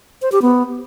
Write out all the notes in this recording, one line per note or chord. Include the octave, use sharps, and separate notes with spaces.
C5
G4
B3